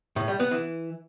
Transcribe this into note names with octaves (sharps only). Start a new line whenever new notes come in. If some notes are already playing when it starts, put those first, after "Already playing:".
A2
G3
B3
E3